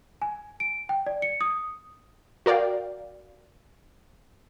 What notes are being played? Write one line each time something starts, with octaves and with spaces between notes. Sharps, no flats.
G#5
D7
G5
D5
C#7
D#6
F#4 A#4 D5 F5 G5